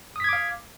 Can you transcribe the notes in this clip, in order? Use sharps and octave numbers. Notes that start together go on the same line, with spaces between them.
F5 D6 D#6 G#6 B6